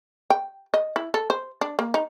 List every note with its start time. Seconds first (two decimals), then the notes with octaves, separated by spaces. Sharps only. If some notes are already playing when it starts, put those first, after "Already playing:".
0.30 G5
0.74 D#5
0.96 E4
1.14 A4
1.30 C5
1.61 D4
1.79 A#3
1.94 D#4